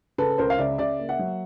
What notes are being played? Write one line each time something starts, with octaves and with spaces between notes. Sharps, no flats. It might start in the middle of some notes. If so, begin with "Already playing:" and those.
C#3 A4 B4
C#2 A#4 C5
F5
C#3 D5 E5
C#3 D5 E5
A#3
E5 F#5
F#3